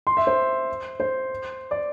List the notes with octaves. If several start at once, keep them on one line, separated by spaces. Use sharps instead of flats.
C6
E5
C5
C5
D5